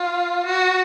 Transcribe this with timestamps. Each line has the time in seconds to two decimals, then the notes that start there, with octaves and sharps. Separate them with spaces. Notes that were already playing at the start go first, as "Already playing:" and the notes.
Already playing: F4
0.46 F#4